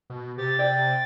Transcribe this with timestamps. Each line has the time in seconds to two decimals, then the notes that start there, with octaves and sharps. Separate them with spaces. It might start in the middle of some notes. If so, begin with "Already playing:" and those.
0.10 B2
0.38 C3 G4 A6
0.59 D5 G5